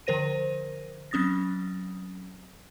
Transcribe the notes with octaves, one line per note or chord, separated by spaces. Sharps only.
D3 F3 A#4 C5 A#6 D#7
F#3 C4 C#4 D#6 A6 A#6